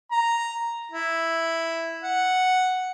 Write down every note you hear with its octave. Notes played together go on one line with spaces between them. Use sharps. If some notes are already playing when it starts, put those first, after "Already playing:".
A#5
E4
F#5